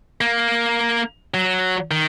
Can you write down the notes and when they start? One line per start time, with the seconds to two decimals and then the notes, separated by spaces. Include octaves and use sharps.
0.21 A#3
1.34 F#3
1.91 D#3